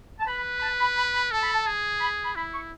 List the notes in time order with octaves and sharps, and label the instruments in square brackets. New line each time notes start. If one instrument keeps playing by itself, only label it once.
[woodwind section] A5
[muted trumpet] B4 [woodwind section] B5
[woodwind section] B5
A5
B5
B5
B5
[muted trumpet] A4 [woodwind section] A5
[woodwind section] B5
A5
[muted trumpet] G#4
[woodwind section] B5
B5
[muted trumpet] E4 [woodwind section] B5
[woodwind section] C#6